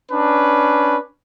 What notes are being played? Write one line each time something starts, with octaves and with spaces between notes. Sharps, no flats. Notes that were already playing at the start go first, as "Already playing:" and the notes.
C#4 D4 B4